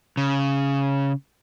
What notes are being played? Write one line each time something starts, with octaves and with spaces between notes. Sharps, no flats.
C#3